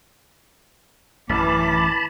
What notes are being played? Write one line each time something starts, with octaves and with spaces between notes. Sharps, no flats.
A1 F#2 E3 A5 B5 D6